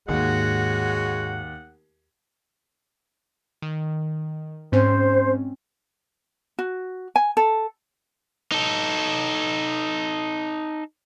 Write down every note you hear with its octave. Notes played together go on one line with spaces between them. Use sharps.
D#2 G#2 G#3 F#4 C#5 F#5
D#3
G#2 C4 C#4 C5
F#4
G#5
A4
D#4 A4